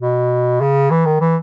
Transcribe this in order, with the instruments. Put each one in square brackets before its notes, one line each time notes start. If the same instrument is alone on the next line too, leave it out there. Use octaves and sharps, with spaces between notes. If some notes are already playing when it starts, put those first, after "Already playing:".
[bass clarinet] B2
C#3
E3
D#3
E3